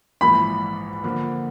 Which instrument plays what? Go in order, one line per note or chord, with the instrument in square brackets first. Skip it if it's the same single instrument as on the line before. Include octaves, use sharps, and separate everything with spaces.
[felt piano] A#1 G#2 E3 [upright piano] B5
[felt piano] D3 F3 A#3